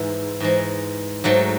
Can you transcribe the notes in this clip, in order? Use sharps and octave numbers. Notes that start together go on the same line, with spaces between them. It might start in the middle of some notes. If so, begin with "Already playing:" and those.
Already playing: G#2 E3 G#3 E4
G#2 E3 G#3
G#2 F#3 A3